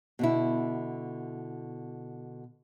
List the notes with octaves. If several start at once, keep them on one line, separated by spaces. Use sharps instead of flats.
B2 D3 E4